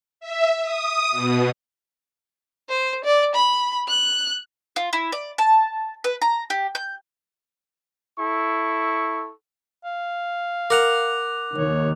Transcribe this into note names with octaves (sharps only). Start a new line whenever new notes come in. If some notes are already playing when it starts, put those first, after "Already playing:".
E5
D#6
B2
C5
D5
B5
F#6
F4
E4
D5
A5
B4
A#5
G4
G6
E4 A4 C#6
F5
A#4 F#5 D6 F#6 F7
D#2 D#3 C#5